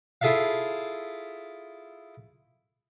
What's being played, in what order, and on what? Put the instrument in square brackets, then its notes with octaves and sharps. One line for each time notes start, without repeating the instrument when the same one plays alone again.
[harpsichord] E4 F4 G#4 A4 E5 F5